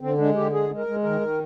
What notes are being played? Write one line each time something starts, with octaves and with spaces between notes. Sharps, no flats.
D3 C4
G#3 D4
D3 G4
G#3 G#4
G#3
A#4
G#3
D#3 A#4
D#3